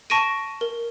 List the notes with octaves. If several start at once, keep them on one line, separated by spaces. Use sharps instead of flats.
A5 C#6 A#6 D7 D#7
A#4